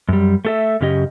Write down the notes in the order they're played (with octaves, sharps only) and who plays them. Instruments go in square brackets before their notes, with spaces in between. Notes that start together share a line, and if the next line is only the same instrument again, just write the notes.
[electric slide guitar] F#2 G3
A3 A4 E5
F#2 C#3 C#4 G4 D#5